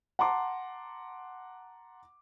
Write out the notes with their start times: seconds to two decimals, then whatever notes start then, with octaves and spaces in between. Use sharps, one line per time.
0.19 F#5 A5 A#5 C6 D6